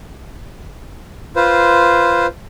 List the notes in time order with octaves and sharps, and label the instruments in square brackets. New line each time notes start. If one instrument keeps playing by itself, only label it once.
[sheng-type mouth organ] F4 B4 C5